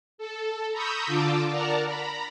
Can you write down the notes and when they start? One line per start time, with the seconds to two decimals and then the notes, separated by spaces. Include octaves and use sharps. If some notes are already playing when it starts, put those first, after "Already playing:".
0.18 A4
0.72 A#5 B5 C#6 D#6 E6 G6
1.07 D3 F4 A5 D6 E6
1.51 A#4 D5 F#5 A5 A#5
1.86 A#5 B5